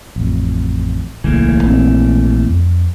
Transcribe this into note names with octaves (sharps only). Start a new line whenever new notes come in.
A1 F2
D1 B1 C#3 E3 A3 A#3
A#1 C4
F2